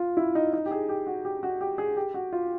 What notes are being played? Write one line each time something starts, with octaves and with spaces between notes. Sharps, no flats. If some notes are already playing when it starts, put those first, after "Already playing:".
Already playing: F4
E4
D#4
D#4
G4
G#4
G4
F#4
G4
F#4
G4
G#4
G4
F#4
F4